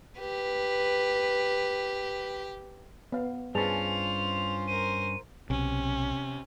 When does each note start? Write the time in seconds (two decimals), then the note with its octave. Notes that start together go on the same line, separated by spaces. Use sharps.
0.20 G4 B4
3.12 B3 F5
3.55 G2 C#4 F4 G#4 B4 C5 A5 F7
4.68 A#4 C5 D#7
5.50 B1 C3 C#4